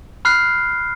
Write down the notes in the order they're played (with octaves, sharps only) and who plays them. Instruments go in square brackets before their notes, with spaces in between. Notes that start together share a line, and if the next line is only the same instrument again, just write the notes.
[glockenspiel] B5 F6 F#6 C7